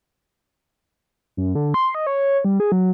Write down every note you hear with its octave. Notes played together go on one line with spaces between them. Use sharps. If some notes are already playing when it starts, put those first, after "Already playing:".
F#2
D3
C6
D#5
C#5
G3
G#4
F#3